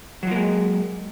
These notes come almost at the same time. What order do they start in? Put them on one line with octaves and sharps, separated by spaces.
F#3 F3 A#3 G#3